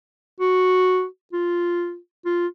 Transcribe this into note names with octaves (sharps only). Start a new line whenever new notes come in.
F#4
F4
F4